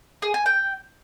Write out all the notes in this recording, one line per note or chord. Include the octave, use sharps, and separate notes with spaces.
G#4
G#5
G5